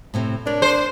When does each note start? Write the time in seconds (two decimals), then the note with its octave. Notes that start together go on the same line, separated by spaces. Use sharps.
0.14 A2 C3 C4
0.46 D4 A#4 C#5 D5
0.62 C5